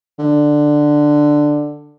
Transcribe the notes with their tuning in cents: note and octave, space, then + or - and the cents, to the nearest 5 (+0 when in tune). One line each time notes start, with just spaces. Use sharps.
D3 +10